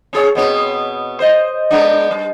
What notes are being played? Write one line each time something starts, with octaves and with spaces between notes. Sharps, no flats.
C4 G#4 C#5
B2 B3 C4
C5 D#5
G#3 B3 D4
G3